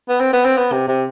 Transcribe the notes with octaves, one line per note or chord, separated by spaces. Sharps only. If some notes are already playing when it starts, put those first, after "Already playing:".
B3
C4
B3
C4
B3
C3
C3